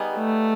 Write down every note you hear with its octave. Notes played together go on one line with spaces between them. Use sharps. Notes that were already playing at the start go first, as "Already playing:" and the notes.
Already playing: G3 B3 D#4 G#4
A3